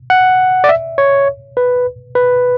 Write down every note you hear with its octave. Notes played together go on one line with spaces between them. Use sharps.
F#5
D5
E5
C#5
B4
B4